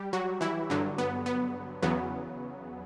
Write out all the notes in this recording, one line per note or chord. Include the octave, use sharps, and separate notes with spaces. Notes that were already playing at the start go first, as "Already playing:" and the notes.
Already playing: G3 G4
F#3 F#4
E3 E4
G2 D3 F#3
B3
B3
E2 C#3 F#3 B3